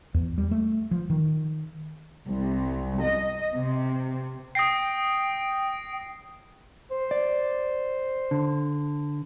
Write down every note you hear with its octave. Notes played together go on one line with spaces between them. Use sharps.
E2
G3
A3
F3
D#3
C2
D#5
C3
G5 D#6 A#6 C7
C5
D5
D3